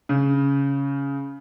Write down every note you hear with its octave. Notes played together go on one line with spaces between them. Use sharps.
C#3